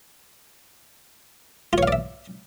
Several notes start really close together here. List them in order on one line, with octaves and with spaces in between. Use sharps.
F4 C#5 F5 D5 E5